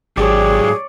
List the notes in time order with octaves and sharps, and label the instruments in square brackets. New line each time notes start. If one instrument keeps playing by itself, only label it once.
[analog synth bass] G#1 [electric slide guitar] G#2 F#3 G4 [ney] G#4 [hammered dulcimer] C#5 D5